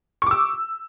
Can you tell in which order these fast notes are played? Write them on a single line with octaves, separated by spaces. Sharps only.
C#6 D6 E6